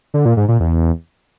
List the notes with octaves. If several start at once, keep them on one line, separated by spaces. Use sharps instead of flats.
D3
A#2
G#2
A#2
E2